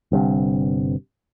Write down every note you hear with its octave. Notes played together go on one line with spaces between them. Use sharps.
G1 G2 C3